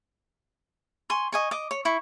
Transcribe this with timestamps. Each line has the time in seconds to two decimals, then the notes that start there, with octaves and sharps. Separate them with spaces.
1.10 G#5 C6 C#6
1.32 D#5 G#5 C#6
1.51 D#5 D6
1.71 C#5
1.85 E4 C#6